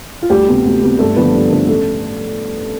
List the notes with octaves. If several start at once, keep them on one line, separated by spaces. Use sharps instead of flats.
F4
D2 G3 G4
C3 G3 B3
D2
C3 G3 B3
G2 A3 A4
D3 F3 A3 B3 B4
G2
D3 F3 A3
A1 A3 A4